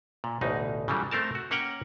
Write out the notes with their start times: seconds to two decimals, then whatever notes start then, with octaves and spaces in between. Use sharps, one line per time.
0.24 A#2
0.41 A1 D2 B2 D#4
0.88 C#3 E3 F#3 G3
1.11 A3 C4 A#4 A5
1.35 F#4
1.51 A#3 C#4 C#5 F#5 G5